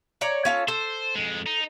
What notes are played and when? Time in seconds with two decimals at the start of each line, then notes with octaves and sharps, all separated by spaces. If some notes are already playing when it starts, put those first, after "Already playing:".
0.21 C#5 D5 A#5
0.45 C#4 F4 A4
0.68 A4 C5
1.15 F2 G#3
1.47 D#4